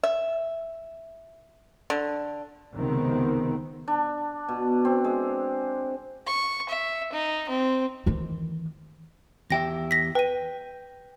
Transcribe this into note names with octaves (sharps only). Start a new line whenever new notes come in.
E5
D3
C#2 C3 D#3 B3 C4
D4
B2
C4
G#3
C#6
E5
D#4
C4
D#3 E3
E2 G4 E5 G5 A#6
A#6 B6
B4 G5 D#7